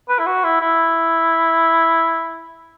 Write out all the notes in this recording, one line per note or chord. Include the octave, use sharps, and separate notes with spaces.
B4
E4
F#4
E4
E4